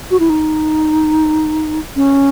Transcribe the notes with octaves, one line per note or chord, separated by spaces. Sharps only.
F#4
E4
D#4
C#4